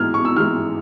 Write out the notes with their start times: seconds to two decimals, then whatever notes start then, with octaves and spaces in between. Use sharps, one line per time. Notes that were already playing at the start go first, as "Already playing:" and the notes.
Already playing: E3 G#3 F6 G#6
0.14 C#6
0.25 E6
0.36 E3 G#3 F6